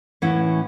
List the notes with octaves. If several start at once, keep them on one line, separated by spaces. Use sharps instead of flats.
A2 E3 C#4 E4 F#5